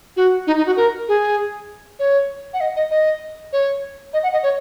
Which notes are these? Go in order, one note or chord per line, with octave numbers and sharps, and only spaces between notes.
F#4
D#4
D#4
F#4
A#4
G#4
C#5
F#5
D#5
D#5
D#5
C#5
D#5
F#5
D#5
C#5